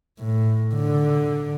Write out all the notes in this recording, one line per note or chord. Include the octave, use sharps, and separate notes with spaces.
A2
D3